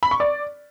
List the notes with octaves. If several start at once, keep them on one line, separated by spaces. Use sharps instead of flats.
B5
C#6
D5